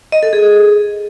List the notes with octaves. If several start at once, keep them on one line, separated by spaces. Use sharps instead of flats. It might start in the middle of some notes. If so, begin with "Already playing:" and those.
D#5
A4
G#4